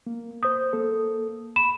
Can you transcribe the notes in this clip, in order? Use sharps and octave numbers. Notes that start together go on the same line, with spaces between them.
A#3
C5 D#6 G6
A#3 A4
B5 E7